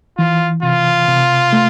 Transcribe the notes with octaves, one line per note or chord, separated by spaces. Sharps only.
E3 F4
C3 F4
C3
A3